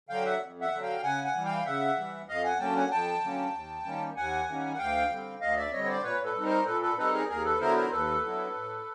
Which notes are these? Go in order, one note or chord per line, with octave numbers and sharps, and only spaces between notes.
D3 F#3 F5 G5
E5 F#5
F2
E5 F#5
D3 F#3
F5 G5
C#3 F#5 G#5
F#5 G#5
E3 G3
F5 G5
C#3 E5 F#5
E3 G3
F2 D#5 F5
F#5 G#5
D3 F#3 A#3 C#4 G5 A5
F#5 G#5
F2 G5 A5
D3 F#3 A#3 C#4
D#2
D#3 G3 A#3 C#4
D#2 F#5 G#5
D#3 G3 A#3 C#4
F#5
D2 F5 G5
D3 G3 C4
D2 D#5 F5
D5 E5
D3 G3 C4 C#5 D#5
C#5
C5 D5
A#2 B4 C#5
A4 B4
G3 C4 D#4
A#4 C5
A#2 A4 B4
A4 B4
G3 C4 D#4 A4 B4
G#4 A#4
D#2 G#4 A#4
A4 B4
D3 F#3 B3 E4 A#4 C5
A#4 C5
D#2 A4 B4
D3 F#3 B3 E4
A2